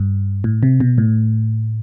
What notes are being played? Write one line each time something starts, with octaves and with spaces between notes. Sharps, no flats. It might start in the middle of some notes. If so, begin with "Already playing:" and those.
Already playing: G2
A2
C3
B2
A2